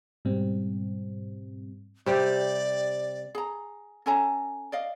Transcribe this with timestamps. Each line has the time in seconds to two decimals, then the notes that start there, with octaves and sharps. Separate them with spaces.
0.25 G#2 B2 G3 C4
2.06 C3 G3 G4 D5
3.35 G#4 A#5
4.06 C#4 A4 G#5 A#5
4.72 D5 D#5 F5